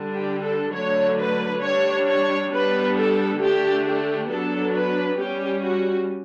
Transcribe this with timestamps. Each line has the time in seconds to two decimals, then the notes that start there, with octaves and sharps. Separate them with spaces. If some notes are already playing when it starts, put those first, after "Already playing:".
Already playing: D3 G3 D4
0.14 G4
0.43 A4
0.73 D3 F#3 A3 D4 C#5
1.17 B4
1.62 G3 D4 C#5
2.07 C#5
2.50 G3 B3 D4 B4
2.95 A4
3.40 D3 A3 D4 G4
3.84 G4
4.28 F#3 B3 D4 A4
4.73 B4
5.17 G3 C#4 G4
5.62 F#4